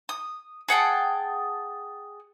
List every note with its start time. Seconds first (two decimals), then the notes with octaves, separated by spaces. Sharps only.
0.09 D#6
0.68 G#4 F#5 G5 A5